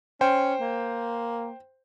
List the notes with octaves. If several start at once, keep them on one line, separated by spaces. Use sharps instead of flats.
C#4 C5 G5 C6
A#3